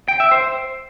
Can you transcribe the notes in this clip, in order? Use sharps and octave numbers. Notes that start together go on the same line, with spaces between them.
G5
E5
C5